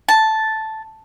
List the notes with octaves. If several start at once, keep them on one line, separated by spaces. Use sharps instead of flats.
A5